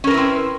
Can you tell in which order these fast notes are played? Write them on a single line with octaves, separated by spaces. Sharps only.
C#4 A#4 B4 E4 C4